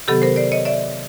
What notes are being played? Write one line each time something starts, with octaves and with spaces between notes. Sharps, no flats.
C3 D#3 F#3 B3 G4 A4
A#4 C5
C5 D5
C#5 D#5
D5 E5